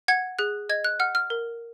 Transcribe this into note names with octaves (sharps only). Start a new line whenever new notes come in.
F#5 G#6
G#4 F#6
D#5 G#6
F#6
F#5 F6
F6
A#4